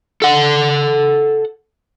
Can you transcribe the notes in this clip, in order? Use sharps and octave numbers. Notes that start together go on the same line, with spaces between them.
A4 F#5